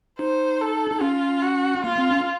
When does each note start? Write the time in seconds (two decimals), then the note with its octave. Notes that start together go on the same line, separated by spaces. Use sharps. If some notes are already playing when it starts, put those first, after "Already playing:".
0.19 D#4 C5
0.61 A4
0.91 D#4
1.01 C#4 F4
1.42 F#4
1.84 A#3 F4
1.98 C4
2.11 C#4